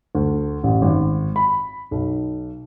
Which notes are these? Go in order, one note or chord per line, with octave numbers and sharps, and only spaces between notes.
D2
A1
G#1
B5
B1